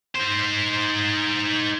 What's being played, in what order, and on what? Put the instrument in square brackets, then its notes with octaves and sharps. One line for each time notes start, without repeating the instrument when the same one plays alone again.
[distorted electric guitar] D#4 C5